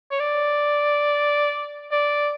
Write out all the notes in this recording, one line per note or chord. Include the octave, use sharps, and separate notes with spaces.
C#5
D5
D5